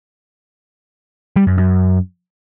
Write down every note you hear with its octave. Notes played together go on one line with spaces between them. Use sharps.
G3
F#2
F#2